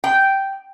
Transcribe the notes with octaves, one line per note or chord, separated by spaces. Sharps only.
G5